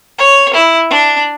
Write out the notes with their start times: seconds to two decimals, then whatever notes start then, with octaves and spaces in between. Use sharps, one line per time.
0.19 C#5
0.54 E4
0.90 D4